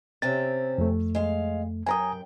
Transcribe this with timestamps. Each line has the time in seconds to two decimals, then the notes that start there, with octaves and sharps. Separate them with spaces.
0.22 C3 C4 C#4 A6
0.78 F2 A3
1.15 G#3 F5
1.86 F#2 A#4 G5 G#5 A#5 D#6